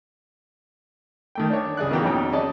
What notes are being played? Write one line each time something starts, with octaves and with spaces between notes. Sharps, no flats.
D#3 A3 G5
D4 C#5
C#2 G#4 D5 F#6
D#3 E3 A#3 B3 F#4 G5
F2 B2 C#4 D#4 G5
C#4 G#4 D5 D#5 A5